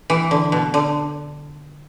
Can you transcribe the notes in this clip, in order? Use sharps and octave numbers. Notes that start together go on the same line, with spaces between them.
E3
D3
B2
D3